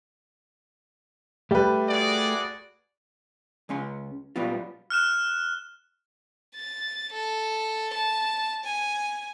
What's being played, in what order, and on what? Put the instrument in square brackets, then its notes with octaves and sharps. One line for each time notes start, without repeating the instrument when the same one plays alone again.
[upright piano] G3 B4 [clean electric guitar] A3 G4
[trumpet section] F#4 G#4 D5
[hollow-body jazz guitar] C#2 G#3 C#4 C6
A#2 F#3 G3 B3 F4
[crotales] F6 F#6 E7
[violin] A6
A4
A5
G#5